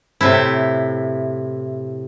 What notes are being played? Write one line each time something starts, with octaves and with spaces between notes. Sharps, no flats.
A2 C3 E4